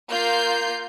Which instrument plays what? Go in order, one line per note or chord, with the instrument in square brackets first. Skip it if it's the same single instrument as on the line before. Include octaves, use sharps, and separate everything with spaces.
[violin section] A#3 F4 G6 C7